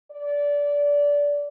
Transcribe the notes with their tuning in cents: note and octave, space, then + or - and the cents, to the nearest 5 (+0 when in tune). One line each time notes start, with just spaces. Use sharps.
D5 -20